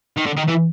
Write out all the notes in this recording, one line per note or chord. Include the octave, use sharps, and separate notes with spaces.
D#3
D3
D#3
E3